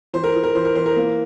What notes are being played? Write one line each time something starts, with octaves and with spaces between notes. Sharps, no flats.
E3 C5
A#4
E3
A#4
E3 C5
A#4
E3 C5
A#4
A#3